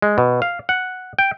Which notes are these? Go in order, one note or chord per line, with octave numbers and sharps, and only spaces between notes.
G#3
B2
F5
F#5
G5